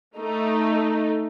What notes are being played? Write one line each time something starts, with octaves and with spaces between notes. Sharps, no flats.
A3 D#4